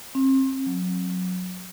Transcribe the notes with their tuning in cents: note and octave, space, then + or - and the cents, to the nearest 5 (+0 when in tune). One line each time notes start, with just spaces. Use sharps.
C4 +35
F#3 -20